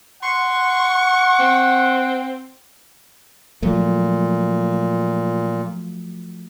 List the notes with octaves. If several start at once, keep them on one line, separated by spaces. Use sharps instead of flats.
F#5 C6 C#6
C4
A#2 F3 F#3 A3